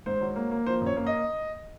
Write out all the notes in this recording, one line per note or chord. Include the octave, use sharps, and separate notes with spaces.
G#2 C5
F#3
A#3
A#3
F3 C5
F#2
C#5
A#3
D#5